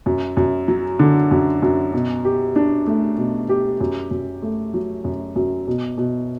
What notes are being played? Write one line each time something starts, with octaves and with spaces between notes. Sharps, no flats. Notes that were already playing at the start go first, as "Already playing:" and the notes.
F#2
F#2
F#3
D3
F#2
F#2
B2
G4
D4
A3
B2
G4
F#2
F#2
A3
F#3
F#2
F#2
B2
B2